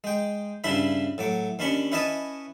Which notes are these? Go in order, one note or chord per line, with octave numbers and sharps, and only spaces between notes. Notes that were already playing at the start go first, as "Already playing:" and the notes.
G#3 G5
G2 C#3 D4 E4 E5 B5
A2 F#3 D6
D#2 C#4 D4 B5 C#6
C#4 E4 B4 D#5 G#5 A5